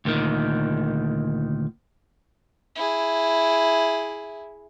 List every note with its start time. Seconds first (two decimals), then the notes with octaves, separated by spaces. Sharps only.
0.05 D2 A#2 D3 D#3
2.76 E4 G#4